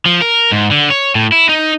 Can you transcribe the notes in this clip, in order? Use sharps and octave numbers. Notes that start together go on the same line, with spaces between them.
F3
A#4
G#2
D3
C#5
A2
E4
D#4